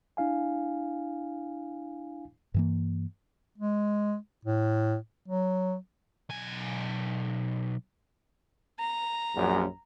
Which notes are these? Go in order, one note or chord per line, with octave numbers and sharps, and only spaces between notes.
D4 E4 F5 G#5
G2 E3 A#3
G#3
A2
F#3
B1 G#5
A#5
A#1 F#2